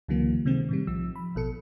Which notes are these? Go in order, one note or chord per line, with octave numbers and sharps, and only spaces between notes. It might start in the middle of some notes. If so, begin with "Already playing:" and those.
C#2 D3 E3 F#3 A#3
C3 D#3 G#3 C4
A2 D#3 G3
B1 F3 E6
B5
A1 B2 A4 C#7